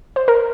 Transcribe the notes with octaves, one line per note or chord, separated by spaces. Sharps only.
C5
A#4